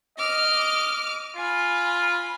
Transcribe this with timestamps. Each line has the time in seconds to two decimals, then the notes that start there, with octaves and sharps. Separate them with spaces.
0.18 D#5 D6 F6
1.37 F4 G#5 B5